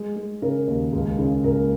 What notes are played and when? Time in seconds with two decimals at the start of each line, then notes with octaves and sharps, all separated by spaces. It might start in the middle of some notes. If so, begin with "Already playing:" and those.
Already playing: G#3
0.16 G#3
0.42 C#3 A#4
0.68 D#2
0.93 C#2
1.19 C#3
1.44 C#2 A#4